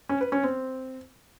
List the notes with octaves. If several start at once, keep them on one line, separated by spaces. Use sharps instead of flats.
C#4
B4
C#4
C4